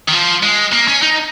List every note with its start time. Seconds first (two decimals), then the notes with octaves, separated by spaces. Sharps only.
0.08 D#3
0.12 F3
0.43 G#3
0.73 A#3
0.88 C#4
1.03 D#4